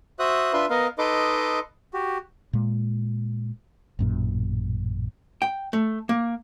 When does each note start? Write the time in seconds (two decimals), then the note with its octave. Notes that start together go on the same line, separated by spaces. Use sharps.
0.19 F#4 C5 E5 D#6 F#6
0.53 D4 F4 B4 E5 C6
0.70 B3 A#4 D#5 F5
0.98 D#4 A4 B4 D#5 C6 D6
1.94 F#4 G4
2.53 A#2 G#3
3.99 A1 F#2 A#2
5.42 G5
5.73 A3
6.09 A#3